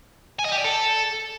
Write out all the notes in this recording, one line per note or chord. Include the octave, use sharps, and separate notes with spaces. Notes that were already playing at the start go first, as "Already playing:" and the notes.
G#5
D#5
G4
D5
A4